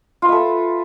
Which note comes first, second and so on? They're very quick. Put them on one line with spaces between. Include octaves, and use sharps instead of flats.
F4 B4 E5 A4